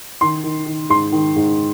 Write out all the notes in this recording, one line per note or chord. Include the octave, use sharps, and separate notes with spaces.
D#3 C6
D#3
D#3
G#2 C6
D#3
G#2